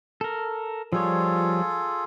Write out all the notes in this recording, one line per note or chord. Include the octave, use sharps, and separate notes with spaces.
A4 A#4
F3 G3 F4 G#4 A4 C#5